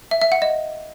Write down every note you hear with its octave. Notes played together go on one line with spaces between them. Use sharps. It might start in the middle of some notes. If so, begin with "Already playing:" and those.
E5
E5
F#5
D#5